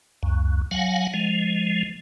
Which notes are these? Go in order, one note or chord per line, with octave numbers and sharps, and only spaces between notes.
C#2 F#2
F#3 F5 F#5 G#5
F3 G#3